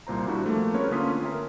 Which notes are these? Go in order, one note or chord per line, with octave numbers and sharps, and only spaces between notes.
C2 A#2 C5 A#5
G3 D4 E4 F#4
F3 A3 A#3
C4 C#4 G#4 A#4 B4 C#5
D3 A#3 C#4 F4 D#6 B6
A#4 E5 G5